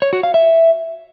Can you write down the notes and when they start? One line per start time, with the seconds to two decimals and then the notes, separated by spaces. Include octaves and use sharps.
0.02 C#5
0.13 F#4
0.23 F5
0.34 E5